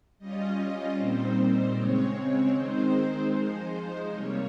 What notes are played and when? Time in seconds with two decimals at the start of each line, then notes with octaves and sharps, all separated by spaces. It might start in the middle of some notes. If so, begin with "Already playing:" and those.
0.19 G3 C#4 F4 D#5
0.97 A#2 G3 C4 D#4 C5
1.76 C#3 G#3 C4 C#5
2.54 D#3 G#3 C4 D#4 C5
3.33 F3 G#3 D#4
4.11 C3 G3 A#3 C#5